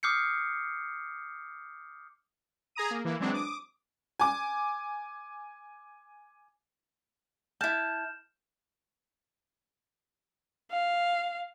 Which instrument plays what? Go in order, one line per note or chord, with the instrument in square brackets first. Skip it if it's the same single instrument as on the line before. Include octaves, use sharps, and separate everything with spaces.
[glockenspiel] D6 D#6 F6 G6 C7 C#7
[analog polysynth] G#4 G#5 A#5 D#6 D#7
A#3
E3 A#3 E4
E3 F#3 G#3 C4 D4
D6 D#6
[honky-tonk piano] G#5 D6
[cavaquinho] E4 A5 [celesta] F6 G6 E7
[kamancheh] F5